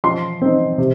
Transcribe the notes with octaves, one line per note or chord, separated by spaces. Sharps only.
F3 C6
C4 D#4
C3